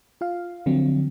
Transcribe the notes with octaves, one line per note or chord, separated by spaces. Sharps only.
F4 F5
D3 F3 F#3 C4